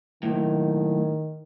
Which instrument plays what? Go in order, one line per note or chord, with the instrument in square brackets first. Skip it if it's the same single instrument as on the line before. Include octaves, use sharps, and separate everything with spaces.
[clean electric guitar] B1 A2 [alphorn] D#3